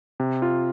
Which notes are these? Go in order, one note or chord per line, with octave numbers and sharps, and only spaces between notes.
C3
F4